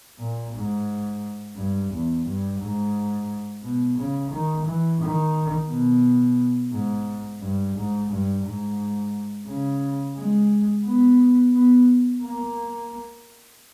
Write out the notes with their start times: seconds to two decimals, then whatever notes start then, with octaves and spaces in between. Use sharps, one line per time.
0.19 A#2
0.53 G#2
1.56 G2
1.91 E2
2.25 G2
2.60 G#2
3.63 B2
3.97 C#3
4.31 D#3
4.66 E3
5.01 D#3
5.69 B2
6.72 G#2
7.41 G2
7.76 G#2
8.10 G2
8.45 G#2
9.48 C#3
10.16 G#3
10.85 B3
11.54 B3
12.23 A#3